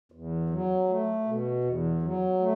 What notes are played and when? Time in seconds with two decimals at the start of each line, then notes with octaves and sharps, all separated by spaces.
0.12 E2
0.50 F#3
0.88 A3
1.26 B2
1.64 E2
2.02 F#3
2.39 A3